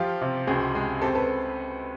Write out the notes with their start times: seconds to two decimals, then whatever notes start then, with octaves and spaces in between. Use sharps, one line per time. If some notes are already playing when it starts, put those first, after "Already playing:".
Already playing: F3 F4 G4
0.21 C3
0.47 C#2 F#4 G#4
0.75 G#3
1.01 C4 G4 A4
1.15 A4 B4